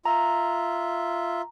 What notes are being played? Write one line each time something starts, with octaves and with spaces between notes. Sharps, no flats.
F4 E5 A#5